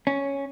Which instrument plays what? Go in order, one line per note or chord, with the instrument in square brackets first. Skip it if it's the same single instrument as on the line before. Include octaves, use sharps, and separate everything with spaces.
[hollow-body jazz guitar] C#4